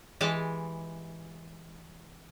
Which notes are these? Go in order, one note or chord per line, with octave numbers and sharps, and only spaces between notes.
E3 G#3 G4 G#5 A5